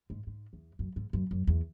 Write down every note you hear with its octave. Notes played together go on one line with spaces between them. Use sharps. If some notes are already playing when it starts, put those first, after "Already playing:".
G#2
G#2
E2
F#2
G#2
F#2
F#2
E2